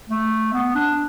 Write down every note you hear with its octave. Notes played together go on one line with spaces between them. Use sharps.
A3
B3
D4